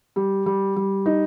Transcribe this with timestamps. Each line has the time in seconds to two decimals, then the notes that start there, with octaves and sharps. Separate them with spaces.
0.16 G3
0.46 G3
0.76 G3
1.06 D#4